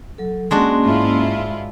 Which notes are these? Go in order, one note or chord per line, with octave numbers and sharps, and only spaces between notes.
F#3 A4
G#3 A#3 C#4 D4 F#4 C6
G#2 E4 F4